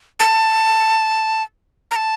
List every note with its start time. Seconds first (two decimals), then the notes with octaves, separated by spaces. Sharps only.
0.20 A5
1.91 A#5
1.96 A5